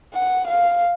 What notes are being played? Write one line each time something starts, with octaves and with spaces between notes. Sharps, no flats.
F#5
F5